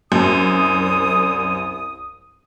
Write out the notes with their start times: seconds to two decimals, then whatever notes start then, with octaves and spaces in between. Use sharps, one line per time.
0.12 C2 F#2 D#6